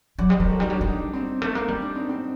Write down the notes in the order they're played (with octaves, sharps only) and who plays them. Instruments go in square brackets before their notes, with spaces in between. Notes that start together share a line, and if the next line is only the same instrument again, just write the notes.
[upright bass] F#3 [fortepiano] D5 F#5
[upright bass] G3 [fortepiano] C5 D#5
[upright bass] F#3 [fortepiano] G4 A#4
[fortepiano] F#4 A4
[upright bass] G3 [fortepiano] D#4 G4
[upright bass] F#3 [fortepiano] D4
[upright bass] G3
[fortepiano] D#4
D4
C4 D#4
[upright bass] A3
A#3
G3
[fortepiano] D4
C4 D#4
C4